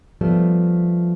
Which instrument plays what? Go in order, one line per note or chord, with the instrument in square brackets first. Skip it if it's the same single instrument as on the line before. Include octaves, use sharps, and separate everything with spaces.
[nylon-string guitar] F3 G3 A3 B3